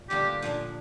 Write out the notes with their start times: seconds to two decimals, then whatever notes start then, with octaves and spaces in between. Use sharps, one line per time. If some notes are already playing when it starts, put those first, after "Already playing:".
Already playing: A#2
0.10 G2 D3 A#3 F4 G4
0.42 A#2 F3 A#3 D4